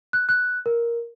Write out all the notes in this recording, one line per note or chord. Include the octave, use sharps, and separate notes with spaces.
F#6
F#6
A#4